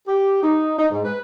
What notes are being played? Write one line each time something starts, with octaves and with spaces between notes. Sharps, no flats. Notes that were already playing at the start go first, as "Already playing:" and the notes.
G4
D#4
D#4
G#2
B4